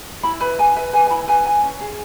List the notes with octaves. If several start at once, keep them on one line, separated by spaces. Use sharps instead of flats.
E4 B5
B4 B5
B4 G#5
B4 E5
B4 G#5
G#5
E4 B5
B4 G#5
B4 G#5
C#4
G#4